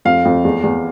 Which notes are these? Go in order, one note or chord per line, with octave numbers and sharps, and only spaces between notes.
F2 F5
F2
E2
E2